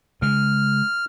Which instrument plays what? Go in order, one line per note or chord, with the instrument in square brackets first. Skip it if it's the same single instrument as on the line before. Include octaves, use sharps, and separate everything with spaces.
[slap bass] C#3 G#3 [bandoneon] F6